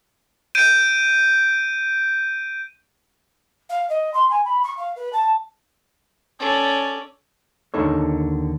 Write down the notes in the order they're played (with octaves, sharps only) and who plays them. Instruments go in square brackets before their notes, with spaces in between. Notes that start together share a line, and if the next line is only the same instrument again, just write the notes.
[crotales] G6 D7 D#7
[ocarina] F5
D#5
C6
G#5
B5
C#6
F5
B4
A5
[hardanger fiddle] C#4 [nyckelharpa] A4 D5
[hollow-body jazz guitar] D#2 D3 D#4 A4 C#5